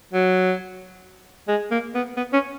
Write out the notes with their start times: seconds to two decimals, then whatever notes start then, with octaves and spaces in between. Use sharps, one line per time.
0.13 F#3
1.48 G#3
1.71 A#3
1.95 B3
2.17 B3
2.33 C#4